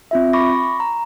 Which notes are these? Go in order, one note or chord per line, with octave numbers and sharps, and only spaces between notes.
C4 F4 E5
B5 C#6 D6 A#6
A#5